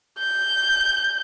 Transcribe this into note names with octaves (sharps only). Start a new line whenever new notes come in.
G6